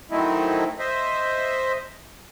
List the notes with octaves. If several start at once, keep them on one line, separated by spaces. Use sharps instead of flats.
D#3 F#3 A3 C4 D#4 E4
C5 D#5 E5